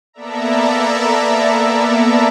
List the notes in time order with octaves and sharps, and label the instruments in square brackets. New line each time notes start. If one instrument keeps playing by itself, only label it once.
[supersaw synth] A#3 B3 A4 D5 E5 A#5